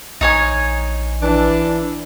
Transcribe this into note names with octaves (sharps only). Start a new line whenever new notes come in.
A#1 D#4 C#5 G#5
E3 D4